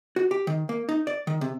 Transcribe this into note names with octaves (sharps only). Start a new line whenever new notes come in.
F#4
G4
D#3
A#3
D#4
D5
D#3
C3